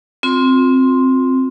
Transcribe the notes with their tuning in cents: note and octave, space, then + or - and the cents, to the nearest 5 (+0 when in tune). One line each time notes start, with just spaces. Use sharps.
C4 +0 F4 +30 C6 +0